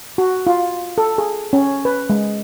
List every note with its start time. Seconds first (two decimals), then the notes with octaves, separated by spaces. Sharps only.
0.18 F#4
0.47 F4
0.98 A4
1.18 G#4
1.53 C#4
1.85 B4
2.10 G#3